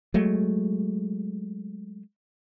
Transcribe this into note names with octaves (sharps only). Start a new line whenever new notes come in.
F#3 G#3 A3